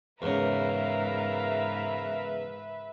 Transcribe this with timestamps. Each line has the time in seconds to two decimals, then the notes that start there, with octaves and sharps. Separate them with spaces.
0.22 E2 G#2 C#3 A#4 B4 E5 F5 A#5